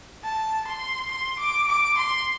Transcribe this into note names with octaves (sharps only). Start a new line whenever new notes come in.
A5
C6
C6
D6
D6
C6